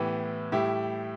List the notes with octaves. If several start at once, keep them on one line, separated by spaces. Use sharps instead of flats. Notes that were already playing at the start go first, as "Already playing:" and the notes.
Already playing: A2 E3 B3 E4 G4
A2 G3 E4 G4